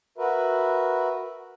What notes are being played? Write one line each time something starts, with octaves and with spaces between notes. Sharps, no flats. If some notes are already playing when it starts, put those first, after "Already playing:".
F#4 A#4 B4 E5